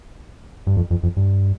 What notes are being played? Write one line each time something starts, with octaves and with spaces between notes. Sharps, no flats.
G2
F2
F2
F2
G2